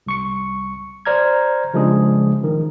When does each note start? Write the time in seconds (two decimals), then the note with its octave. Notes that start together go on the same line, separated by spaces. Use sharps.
0.06 C2 C#6 C#7
1.05 C5 D5 A#5 F6 G#6
1.74 C#3 F3 G#3 D4 G#4
2.43 A1 D#3 F3